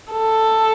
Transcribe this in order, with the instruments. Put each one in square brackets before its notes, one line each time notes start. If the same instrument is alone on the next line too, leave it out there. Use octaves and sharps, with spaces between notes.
[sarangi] A4